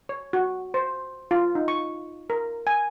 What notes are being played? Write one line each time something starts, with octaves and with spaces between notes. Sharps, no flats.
C#5
F#4
C5
F4
D#4
C#6
A#4
G#5